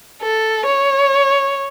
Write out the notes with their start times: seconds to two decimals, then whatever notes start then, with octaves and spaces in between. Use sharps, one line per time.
0.22 A4
0.66 C#5